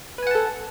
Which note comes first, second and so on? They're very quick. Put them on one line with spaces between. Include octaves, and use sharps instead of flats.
B4 G#5 F#5 A5 A4